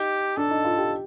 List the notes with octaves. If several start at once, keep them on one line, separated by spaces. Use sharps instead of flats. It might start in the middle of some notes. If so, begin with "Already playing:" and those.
Already playing: D#4 G4
D4 A4
D#4
F4
G4